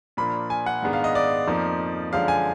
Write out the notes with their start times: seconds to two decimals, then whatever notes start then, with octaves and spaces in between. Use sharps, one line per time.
0.17 A#2 F3 A#3 D4 B5
0.50 G#5
0.66 F#5
0.82 G#2 D#3 G#3 B3 D4
0.93 F5
1.04 D#5
1.15 D5
1.47 F2 F3 A#3 D#4
2.13 F#2 D3 F3 G#3 D4 F5
2.28 G#5